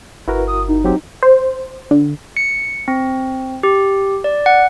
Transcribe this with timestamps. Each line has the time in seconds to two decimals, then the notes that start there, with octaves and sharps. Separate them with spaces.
0.28 G1 E4 F#4 A#4 B4
0.48 D#6
0.68 D#4
0.84 F#3 C4 G4
1.23 C5
1.91 D3
2.37 C#7
2.88 C4
3.63 G4
4.24 D5
4.46 F#5